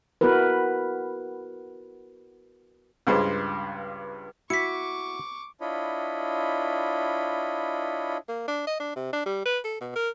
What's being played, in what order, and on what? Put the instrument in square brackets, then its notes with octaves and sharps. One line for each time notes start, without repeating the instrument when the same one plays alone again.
[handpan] B3 E4 F#4 A#4 B4
[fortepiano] C#2 G2 G#3 C5
[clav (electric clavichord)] E4 [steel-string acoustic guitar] F#4 [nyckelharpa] C#6 D6 [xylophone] B6 C#7
[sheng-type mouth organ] D4 E4 F4 C#5 D#5 B5
[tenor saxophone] A#3
D4
D#5
D4
C3
D4
G3
B4
A4
B2
A#4